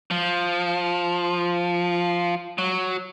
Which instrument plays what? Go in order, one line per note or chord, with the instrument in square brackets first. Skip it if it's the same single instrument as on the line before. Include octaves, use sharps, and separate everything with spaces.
[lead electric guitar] F3
F#3